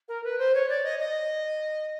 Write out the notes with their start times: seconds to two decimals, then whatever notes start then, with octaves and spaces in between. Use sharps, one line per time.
0.08 A#4
0.24 B4
0.38 C5
0.54 C#5
0.69 D5
0.83 D#5
0.99 D#5